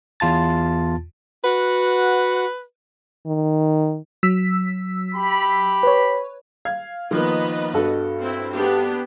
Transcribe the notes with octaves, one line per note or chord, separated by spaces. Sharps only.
E2 F4 A5 A6
F#4 B4 F#5
D#3
F#3 E6 B6
G4 B5
B4 C#5
F5 G#6
D#3 F3 A#3 B3 B4 D#5
G2 F#4 A4
C4 E4
B3 D4 G4